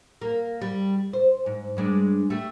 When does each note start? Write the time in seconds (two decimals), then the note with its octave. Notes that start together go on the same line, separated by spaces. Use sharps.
0.21 A#3
0.62 G3
1.13 C5
1.46 G#2
1.77 G2 G#3 D4
2.30 G3 A3